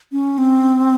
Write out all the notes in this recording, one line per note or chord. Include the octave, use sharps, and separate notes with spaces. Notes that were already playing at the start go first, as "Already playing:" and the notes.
C#4
C4